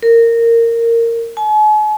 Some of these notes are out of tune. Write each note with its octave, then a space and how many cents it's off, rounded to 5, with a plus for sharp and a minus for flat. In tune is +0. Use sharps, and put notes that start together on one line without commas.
A#4 -15
G#5 +45